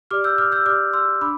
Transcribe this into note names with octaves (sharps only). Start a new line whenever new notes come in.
G4 D5 D6 F6
E6 G6
D6 F6
E6 G6
G4 D5 D6 F6
C6 E6
D4 B5 D6